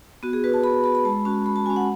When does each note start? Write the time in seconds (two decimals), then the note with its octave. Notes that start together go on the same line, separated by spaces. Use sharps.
0.23 B3 F#4
0.33 G#4
0.44 F#4 B4
0.54 A5
0.64 B3 B5
0.84 F#4 B5
0.95 B5
1.04 G#3 A5
1.25 C#4 F#4 A5
1.45 G#3 B5
1.56 A5
1.66 C#4 F#4 G#5
1.76 F#5